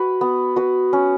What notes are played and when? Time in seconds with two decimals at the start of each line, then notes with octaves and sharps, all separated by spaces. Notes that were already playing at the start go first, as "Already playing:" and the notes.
Already playing: F#4 B4
0.21 B3
0.56 F#4 B4
0.93 C#4